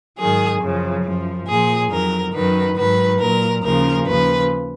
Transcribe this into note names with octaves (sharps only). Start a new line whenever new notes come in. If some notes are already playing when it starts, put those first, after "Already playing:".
G#2 D#3 F#3 G#4
F#2 C#3 F3
F#2 F3
A#2 F3 G#4
F2 D#3 F#3 A#4
F#2 D#3 F#3 B4
G#2 D#3 F#3 B4
A#2 F#3 A#4
D#2 C#3 F3 A#4
D#2 C#3 F3 B4